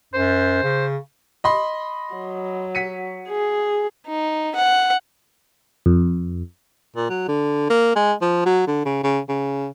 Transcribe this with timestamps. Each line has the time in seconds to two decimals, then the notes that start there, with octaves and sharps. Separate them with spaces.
0.14 F#2 C5
0.63 C#3
1.44 D#5 B5 C6
2.15 F#3
2.75 B6 C#7 D#7
3.29 G#4
4.07 D#4
4.56 F#5
5.86 F2
6.96 A#2
7.10 F#3
7.28 D3
7.70 A#3
7.96 G#3
8.22 F3
8.46 F#3
8.67 D3
8.85 C#3
9.04 C#3
9.29 C#3